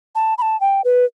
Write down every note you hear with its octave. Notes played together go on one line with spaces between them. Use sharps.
A5
B5
A5
G5
B4